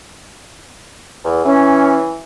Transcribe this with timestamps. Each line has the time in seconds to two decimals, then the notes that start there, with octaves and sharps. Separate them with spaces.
1.25 E2
1.45 E3 C#4